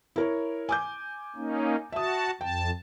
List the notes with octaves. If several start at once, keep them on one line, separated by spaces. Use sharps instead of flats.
E4 A#4 C#5
G#5 D6 G6
A#3 C#4 D#4
F#4 E5 A5 D#6
F2 G5 A5